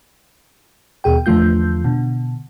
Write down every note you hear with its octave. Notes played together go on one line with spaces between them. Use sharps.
D#2 B2 G#4 G5
E2 D3 F3 A3 F4 G6
B2 D3